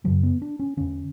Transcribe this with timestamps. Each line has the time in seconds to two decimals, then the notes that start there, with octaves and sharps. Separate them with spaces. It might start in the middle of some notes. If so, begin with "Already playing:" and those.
0.04 F#2 C#3 F#3
0.23 B3
0.42 D4
0.59 C#4
0.77 E2 D3 C#4